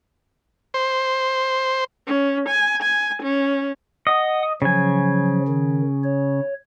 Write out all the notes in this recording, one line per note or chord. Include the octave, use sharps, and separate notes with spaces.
C5
C#4
G#5
G#5
C#4
D#5 F#5 D#6
C#3 F3 F#3 G#5
D#3
C#5